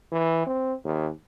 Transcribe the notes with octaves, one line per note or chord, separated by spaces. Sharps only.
E3
C4
D#2